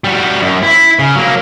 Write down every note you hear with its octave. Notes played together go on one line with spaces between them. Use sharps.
G3 F#4
F#2
E4
C#3
F#3 A#3